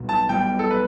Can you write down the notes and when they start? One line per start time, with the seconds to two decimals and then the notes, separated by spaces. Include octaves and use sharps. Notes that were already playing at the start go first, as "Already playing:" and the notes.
Already playing: B1 B2 G3
0.09 A5
0.29 B1 B2 G3 B3 G5
0.59 A4
0.70 B4